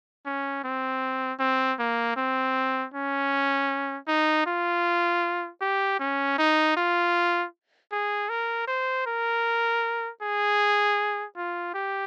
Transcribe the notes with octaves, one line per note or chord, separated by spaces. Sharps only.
C#4
C4
C4
A#3
C4
C#4
D#4
F4
G4
C#4
D#4
F4
G#4
A#4
C5
A#4
G#4
F4
G4